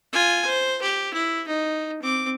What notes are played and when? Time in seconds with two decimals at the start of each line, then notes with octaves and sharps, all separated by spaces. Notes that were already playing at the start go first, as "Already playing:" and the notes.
0.13 F4 G#5
0.46 C5
0.82 G4
1.14 E4
1.47 D#4
2.02 C4 D6